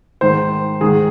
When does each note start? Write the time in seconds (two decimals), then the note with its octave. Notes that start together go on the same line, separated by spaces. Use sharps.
0.21 G#2 D#3 C5
0.81 G#2 D#3 G#4